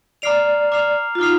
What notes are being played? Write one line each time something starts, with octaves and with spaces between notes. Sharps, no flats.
D5 A#5 D6 F6 C7 F7
A#5 D6 F6 C7 F7
F4
D#4 A#5 D6 F6 C7 F7